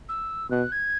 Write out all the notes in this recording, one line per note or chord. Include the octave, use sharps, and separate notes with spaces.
E6
B2 F#6
G#6